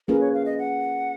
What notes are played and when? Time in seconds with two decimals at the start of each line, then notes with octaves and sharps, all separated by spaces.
0.08 A#3 C#4 F4 G#4 A#4 B4
0.21 C#5
0.34 F5
0.46 D#5
0.59 F#5